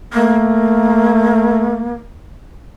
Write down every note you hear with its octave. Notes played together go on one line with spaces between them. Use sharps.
A3 A#3